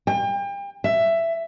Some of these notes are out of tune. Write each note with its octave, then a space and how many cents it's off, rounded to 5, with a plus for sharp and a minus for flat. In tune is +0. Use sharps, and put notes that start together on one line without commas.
G5 +35
E5 +10